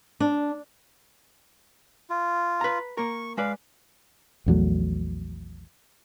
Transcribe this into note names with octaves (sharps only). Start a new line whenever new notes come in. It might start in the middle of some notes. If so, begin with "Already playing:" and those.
D4
F4
B4 A#5
A#3 A#4 C#6
G#3 B4 D5 F5
A#1 E2 F#3 A3